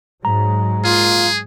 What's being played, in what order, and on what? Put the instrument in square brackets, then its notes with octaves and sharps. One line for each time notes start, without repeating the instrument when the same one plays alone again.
[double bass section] G#2 F#3 G#3 [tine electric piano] A#5
[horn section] A#2 F4 [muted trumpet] G#4